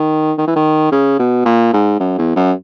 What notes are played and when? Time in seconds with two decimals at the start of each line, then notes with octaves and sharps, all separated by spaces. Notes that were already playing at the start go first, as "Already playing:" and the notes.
Already playing: D#3
0.38 D#3
0.47 E3
0.56 D#3
0.92 C#3
1.19 B2
1.45 A#2
1.74 G#2
2.00 F#2
2.18 E2
2.36 F#2